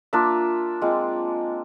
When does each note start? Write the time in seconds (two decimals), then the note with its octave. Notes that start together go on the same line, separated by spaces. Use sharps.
0.13 A#3 D4 F4 E5
0.81 G#3 C4 F4